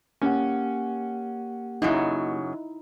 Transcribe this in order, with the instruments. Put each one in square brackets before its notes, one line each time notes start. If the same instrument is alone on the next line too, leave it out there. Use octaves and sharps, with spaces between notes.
[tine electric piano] A#3 G4 F#5 [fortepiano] C#4
[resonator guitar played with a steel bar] F#2 C#3 F#3 [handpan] D#4 E4